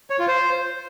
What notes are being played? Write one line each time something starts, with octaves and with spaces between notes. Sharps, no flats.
C#5
F4
C5